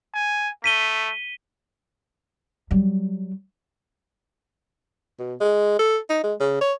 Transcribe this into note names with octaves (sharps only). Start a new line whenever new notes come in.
G#5
A3 B6 D#7 G7
F#3 G3
B2
G#3
A4
D#4
G#3
C#3
C#5